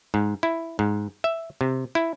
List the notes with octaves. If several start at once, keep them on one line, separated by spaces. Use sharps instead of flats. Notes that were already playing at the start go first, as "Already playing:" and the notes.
G#2
E4
G#2
E5
C3
E4